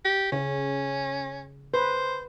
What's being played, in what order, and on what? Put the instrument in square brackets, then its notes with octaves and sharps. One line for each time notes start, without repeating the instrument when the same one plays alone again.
[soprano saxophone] G4
[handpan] C#3 [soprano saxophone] C#4
[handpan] B4 [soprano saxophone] C5